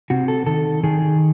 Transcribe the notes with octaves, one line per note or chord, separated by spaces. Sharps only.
C3 F#4
A4
D#3 A4
D#3 G#4